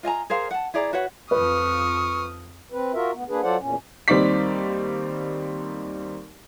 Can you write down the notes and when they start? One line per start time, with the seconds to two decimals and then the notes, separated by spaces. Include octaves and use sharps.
0.03 F4 D#5 G#5 A#5
0.30 G#4 A#4 C5 F5
0.51 F#5 A5
0.74 E4 G#4 D5 A#5
0.93 F#4 B4 C#5 F#5
1.31 F2 F3 B4 C#6 D#6 F6
2.72 C4 B4
2.94 F4 F#4 A#4 E5
3.13 D2 B3
3.29 A#3 D4 G#4 B4
3.43 F#3 F4 A4 C5 D5 F#5
3.59 E2 A#2 C#4
4.08 D#2 G3 C4 D#4 D5 B6